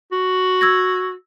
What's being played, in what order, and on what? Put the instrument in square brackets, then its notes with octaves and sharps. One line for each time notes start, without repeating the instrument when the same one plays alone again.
[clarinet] F#4
[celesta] E6 G#6 A#6